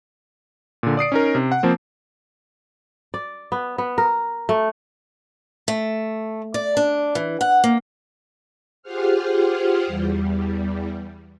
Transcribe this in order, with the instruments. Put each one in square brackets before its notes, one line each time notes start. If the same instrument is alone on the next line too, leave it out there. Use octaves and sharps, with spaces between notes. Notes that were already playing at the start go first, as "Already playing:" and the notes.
[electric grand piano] A#2 D3
D5 D#6 C7 D7
C#4 D#4 A#4
C3
F#5
F3 A#3 C4
[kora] D5
B3
B3
A#4
A3
[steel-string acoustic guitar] A3
D5
D4
E3
F#5
A#3
[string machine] F4 G4 G#4 C5 F#5 F6
E2 G3